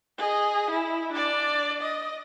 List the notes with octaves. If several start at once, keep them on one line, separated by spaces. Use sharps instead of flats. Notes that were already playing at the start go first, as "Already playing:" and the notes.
G#4 D#5
E4
D4 D5
D#5